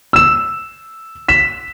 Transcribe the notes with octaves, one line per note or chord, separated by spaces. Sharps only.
E6 E7
B6 E7